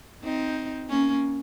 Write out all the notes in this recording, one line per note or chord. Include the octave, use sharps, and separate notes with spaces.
C4 D#4
A#3 C#4